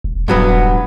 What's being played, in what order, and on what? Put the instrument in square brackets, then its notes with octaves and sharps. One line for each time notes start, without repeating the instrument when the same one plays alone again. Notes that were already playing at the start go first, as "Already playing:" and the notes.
[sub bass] E1
[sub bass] D#1 [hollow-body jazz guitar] G2 F#3 B3